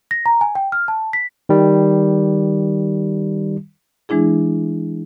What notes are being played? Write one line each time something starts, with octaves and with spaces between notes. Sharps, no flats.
A#6
A#5
G#5
G5
F6
A5
B6
D#3 G3
E3 G#3 D4 E4 G#4